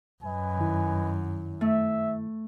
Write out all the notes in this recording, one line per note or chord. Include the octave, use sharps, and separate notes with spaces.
F#2 B4 D#5 G#5
G2 D#3 E4
A3 E5